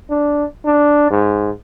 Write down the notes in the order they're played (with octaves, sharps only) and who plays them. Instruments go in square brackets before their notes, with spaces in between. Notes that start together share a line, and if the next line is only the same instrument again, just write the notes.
[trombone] D4
D4
G#2